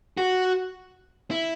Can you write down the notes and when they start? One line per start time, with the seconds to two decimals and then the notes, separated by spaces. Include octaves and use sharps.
0.17 F#4
1.31 E4